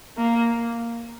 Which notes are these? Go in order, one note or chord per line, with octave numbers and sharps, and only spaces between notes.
A#3